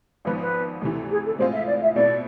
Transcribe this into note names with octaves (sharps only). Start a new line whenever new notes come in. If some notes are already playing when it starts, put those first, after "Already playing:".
G#1 G#2 F3 B3 B4
B4
D2 C3 E3
G#4
A4
A2 G#3 C4 F4 C5
E5
D5
E5
B2 A3 C4 E4 D5